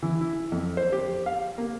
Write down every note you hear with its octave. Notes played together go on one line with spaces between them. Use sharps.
E3
E4
F2
C5
G4
F5
A#3